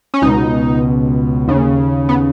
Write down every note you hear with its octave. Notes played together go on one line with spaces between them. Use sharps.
C#4
C#2 B2 D#4
D#2 C#3
B3